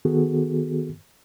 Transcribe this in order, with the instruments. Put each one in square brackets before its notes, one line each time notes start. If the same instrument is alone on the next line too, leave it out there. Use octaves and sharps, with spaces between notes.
[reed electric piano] D#3 B3 F#4 G#4 A4